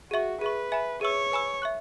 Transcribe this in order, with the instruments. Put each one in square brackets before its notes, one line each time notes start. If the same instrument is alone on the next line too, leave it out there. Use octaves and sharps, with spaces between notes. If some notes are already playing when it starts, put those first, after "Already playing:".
[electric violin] F#4 [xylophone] G#4 E5 C#6
[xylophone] G#4 E5 C#6 [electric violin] B4
[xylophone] E5 G#5 B5
[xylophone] G#4 B4 E5 C#6 E6 [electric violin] C#5
[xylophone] B4 G#5 B5 E6
E5 C#6 F#6